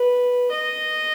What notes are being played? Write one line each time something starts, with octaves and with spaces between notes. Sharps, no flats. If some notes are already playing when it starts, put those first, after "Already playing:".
Already playing: B4
D#5